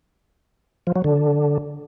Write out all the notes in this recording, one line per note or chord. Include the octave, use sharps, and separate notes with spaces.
F3
F#3
D3